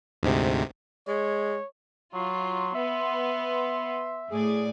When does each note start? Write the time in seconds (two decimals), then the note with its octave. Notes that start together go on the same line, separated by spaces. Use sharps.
0.23 D2 G#2 C3
1.08 G#3 C#5
2.13 F#3 F4 C6
2.74 B3 E5
4.30 A2 G#4 D5 G#5